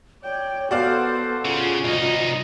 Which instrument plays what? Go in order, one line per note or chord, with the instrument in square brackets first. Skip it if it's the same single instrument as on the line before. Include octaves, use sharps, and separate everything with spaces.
[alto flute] C#5 [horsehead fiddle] D5 G5
[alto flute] B3 [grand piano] F#4 D5 F5 [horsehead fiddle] A4 C5
[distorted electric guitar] C#3 [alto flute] F4
[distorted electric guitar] C2 D#4 [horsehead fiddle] D#5